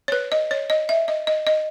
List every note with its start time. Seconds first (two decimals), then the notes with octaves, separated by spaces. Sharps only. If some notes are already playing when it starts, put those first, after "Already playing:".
0.08 C#5
0.12 B4
0.32 D#5
0.51 C#5
0.70 D#5
0.89 E5
1.08 D#5
1.27 D#5
1.47 D#5